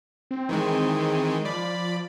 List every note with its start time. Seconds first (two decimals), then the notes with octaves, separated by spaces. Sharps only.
0.31 C4
0.49 D#3 E3 G#3
1.45 F3 D5 B5